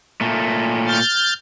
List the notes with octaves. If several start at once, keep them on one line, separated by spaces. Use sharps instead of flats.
A#2 A3
F6 G6 A6